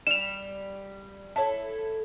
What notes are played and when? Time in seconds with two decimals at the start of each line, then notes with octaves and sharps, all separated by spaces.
0.07 G3 E7 F7
1.36 E4 A4 C#5 A5